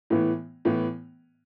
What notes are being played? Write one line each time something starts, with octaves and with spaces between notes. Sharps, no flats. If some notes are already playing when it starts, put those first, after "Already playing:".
A2 E3 B3
A2 E3 B3